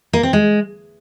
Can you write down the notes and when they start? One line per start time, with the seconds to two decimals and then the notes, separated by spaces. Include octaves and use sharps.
0.13 A#3
0.23 C4
0.33 G#3